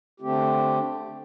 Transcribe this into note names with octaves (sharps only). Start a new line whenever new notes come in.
D3 A3 C4 G4